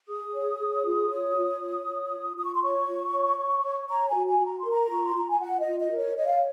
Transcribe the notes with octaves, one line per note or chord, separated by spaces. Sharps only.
G#4 D#6
C#5
G#4
F4
C#5
F4
C#5
C#5
F4
F4 D#6
C#6
C6
C#5 C#6
F4
C#5
C#5
C#5
C#5 A#5
G#5
F#4
G#5
F#4
A#5
C6
A#4
A#5
F4 C#6
C6
F4 A#5
G#5
F4 F#5
D#5
F4
D#5
A#4
C#5
C#5 D#5
F5